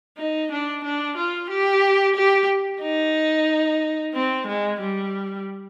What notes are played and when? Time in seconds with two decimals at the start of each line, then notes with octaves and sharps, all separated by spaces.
0.18 D#4
0.52 D4
0.84 D4
1.17 F4
1.50 G4
2.16 G4
2.82 D#4
4.14 C4
4.47 G#3
4.80 G3